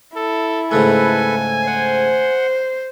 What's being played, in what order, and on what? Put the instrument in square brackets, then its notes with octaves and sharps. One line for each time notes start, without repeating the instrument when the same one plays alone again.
[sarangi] E4 [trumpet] A4
[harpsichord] G#2 C#3 A3 [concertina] A4 B4 [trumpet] G#5
[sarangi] C5 [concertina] F#5